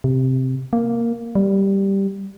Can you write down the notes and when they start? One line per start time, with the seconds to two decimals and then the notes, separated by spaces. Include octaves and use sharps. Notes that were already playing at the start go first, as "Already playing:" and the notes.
0.04 C3
0.73 A#3
1.35 G3